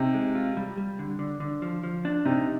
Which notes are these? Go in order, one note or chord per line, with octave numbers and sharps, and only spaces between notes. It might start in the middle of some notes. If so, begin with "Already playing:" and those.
Already playing: C3 D#4
G#3
F4
G3
G3
D3
D3
D3
F3
F3
D4
C3 D#4